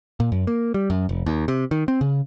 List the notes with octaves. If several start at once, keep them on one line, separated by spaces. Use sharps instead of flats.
A#2
F#2
A#3
G3
F#2
F1
D#2
C3
D#3
C4
C#3